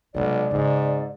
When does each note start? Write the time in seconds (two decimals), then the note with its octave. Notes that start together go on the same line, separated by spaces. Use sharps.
0.14 B1 C3 G#3 D5
0.51 G#2 C#3 C4